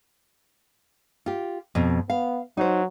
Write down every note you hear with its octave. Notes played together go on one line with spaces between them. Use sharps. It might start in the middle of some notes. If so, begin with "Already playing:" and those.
F4 G4
F2 B2
B3 F5
F#3 D#4 C5